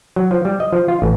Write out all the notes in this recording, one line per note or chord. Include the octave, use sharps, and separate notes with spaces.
F#3
F3
G3
D#5
F3
F4
A1